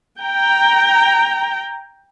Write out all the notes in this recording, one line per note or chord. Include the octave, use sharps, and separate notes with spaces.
G5 A#5